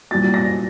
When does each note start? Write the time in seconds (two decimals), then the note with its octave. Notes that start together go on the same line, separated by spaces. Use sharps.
0.11 C2 A#2 F#3 A6
0.34 A#6